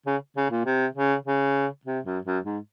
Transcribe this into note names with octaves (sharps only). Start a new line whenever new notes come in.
C#3
C#3
A#2
C3
C#3
C#3
C3
F#2
F#2
G#2